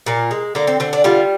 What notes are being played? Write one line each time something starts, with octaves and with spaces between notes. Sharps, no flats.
A#2 A#3
G#3
D3 A#3
C4
D3 C4
D4
G3 F4